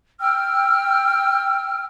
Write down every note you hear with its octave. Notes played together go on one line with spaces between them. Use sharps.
G5 E6 F6